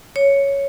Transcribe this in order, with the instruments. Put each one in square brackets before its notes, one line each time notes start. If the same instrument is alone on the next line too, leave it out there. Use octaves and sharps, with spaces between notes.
[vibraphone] C#5